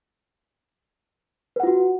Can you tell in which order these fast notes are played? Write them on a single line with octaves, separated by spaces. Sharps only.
B4 F#5 F4 F#4